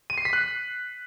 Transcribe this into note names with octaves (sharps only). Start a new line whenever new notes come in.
D#7
C7
B6
F#6